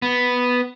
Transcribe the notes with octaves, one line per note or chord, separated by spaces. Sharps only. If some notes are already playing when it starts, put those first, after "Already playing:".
B3